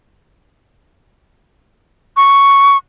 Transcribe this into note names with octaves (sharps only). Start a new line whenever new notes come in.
C#6